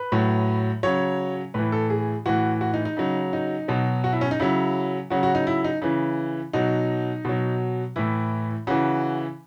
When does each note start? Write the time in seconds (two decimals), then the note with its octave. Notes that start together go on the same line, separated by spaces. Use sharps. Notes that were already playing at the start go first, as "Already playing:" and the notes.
Already playing: B4
0.12 A2 F#3
0.83 C#3 F#3 C#5
1.54 A2 E3 B4
1.72 A4
1.90 G#4
2.26 A2 E3 F#4
2.61 F#4
2.74 D#4
2.85 D#4
2.97 C#3 F#3
3.33 D#4
3.68 B2 F#3
4.04 F#4
4.13 E4
4.21 C#4
4.31 D#4
4.40 C#3 F#3 E4
5.10 C#3 F#3 F#4
5.23 F#4
5.35 D#4
5.47 E4
5.64 D#4
5.82 C#3 E3
6.53 B2 F#3 D#4
7.25 B2 F#3
7.96 A2 E3 E4
8.67 C#3 E3 F#4